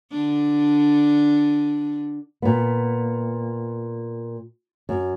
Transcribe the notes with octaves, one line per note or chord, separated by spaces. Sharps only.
D3 D4
A#2 B3
F#2